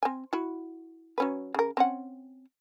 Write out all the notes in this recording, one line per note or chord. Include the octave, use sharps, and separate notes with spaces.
C4 G#5
E4 F#4
F#3 C#4 B4
C#3 A#4
C4 C#4 F#5